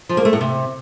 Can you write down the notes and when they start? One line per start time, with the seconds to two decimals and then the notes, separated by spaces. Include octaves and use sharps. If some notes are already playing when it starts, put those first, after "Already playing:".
0.09 F3
0.17 A#3
0.25 A3
0.33 A2
0.41 C3